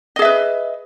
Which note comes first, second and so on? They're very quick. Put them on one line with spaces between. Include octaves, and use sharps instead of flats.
D#5 G#4 E5 B4